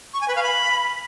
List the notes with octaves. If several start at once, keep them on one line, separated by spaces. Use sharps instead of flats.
C#6
G#5
B4
F5
B5